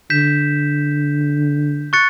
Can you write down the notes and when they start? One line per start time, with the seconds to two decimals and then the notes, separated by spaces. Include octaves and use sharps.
0.10 D3 G6 B6 E7
1.93 C#6 F#6 A6 C#7